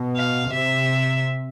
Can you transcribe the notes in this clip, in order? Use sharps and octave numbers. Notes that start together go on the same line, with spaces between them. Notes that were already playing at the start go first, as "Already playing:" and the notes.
Already playing: B2
F5
C3 E5